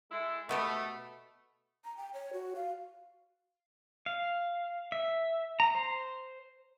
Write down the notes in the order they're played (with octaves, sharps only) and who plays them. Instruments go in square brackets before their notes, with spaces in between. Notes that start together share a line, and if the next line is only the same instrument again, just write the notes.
[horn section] G#3 E4 A4
[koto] B2 B3 G4 [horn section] A3
[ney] A#5
G5
C#5
F#4
F5
[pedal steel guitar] F5
E5
A#5
C5